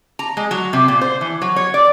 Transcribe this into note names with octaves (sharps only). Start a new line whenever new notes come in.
A#5
G#3
F#3
C3
A#2
C5
E3
F#3
C#5
D5